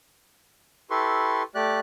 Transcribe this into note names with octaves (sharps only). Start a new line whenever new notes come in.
E4 G4 A4 B4 C6 C#6
A3 G4 D5 F#6